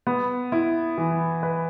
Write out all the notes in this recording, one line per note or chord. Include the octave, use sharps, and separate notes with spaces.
B3
E4
E3
B4